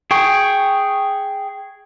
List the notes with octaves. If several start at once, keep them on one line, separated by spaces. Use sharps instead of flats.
G#4 G5 C#6